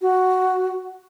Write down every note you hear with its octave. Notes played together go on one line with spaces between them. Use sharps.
F#4